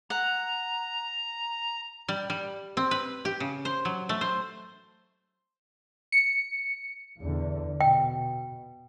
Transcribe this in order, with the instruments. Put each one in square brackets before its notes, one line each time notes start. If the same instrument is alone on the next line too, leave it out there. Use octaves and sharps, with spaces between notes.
[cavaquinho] F#5 [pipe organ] A#5
[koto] G3
G3
C4
B4
G4
C#3
C5
F#3
A3
C5
[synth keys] C#7
[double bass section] E2 D3
[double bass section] B2 [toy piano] G5